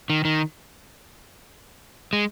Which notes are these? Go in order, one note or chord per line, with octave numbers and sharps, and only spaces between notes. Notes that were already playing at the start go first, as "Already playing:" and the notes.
D#3
D#3
G#3